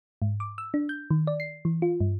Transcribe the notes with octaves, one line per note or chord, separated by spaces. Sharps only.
G#2
D6
E6
D4
G6
D#3
D5
C7
E3
F4
G2